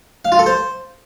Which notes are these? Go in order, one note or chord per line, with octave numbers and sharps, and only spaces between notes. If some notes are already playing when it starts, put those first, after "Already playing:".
F5
F4
A4
C5